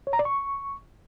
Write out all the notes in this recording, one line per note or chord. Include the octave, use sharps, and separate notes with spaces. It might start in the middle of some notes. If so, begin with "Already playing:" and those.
C#5
A#5
D5
C#6